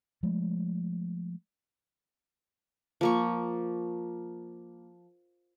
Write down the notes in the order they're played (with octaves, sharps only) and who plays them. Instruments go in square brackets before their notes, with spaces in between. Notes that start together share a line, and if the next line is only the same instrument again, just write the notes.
[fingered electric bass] F3 G#3 A3
[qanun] F3 A#3 C#6